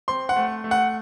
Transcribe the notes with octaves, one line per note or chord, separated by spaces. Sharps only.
C4 C6
F#5
A3
A3
F#5